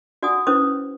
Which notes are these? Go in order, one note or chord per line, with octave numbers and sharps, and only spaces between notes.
F#4 D5 F#5 G#5 D#6
C#4 E4 B4 C5 D6 D#6